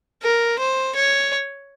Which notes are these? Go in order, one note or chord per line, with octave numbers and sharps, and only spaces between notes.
A#4
C5
C#5